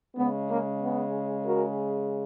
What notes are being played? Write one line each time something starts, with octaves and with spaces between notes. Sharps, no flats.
C#3 G#3 B3
A#3 C#4
B3
F#4 A#4